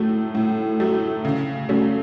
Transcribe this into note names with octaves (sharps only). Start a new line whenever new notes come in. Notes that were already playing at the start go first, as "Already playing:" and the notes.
Already playing: A2 F#3 A3
A2
F#3 A3
C#3
F#3 A3 C#4